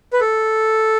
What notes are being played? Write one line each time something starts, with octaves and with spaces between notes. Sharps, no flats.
B4
A4